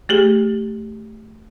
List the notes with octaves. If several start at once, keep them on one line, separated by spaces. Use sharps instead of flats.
A3 G4 G#4